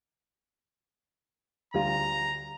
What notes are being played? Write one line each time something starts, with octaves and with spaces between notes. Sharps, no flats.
D2 G3 F4 A#5